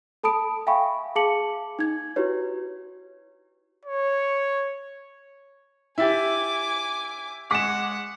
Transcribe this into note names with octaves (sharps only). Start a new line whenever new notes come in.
A4 A5 B5 D#6 D7
E5 F5 G5 G#5 B5 C#6
G#4 F5 A5 D6 C#7 F#7
D#4 G#6
E4 F#4 G4 B4 C#5
C#5
E4 G4 E5 G#5 D6 A6
G#3 G#4 F#5 D6 B6 E7